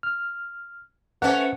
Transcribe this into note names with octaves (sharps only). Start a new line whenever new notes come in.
F6
A3 C#4 B4 C5 F#5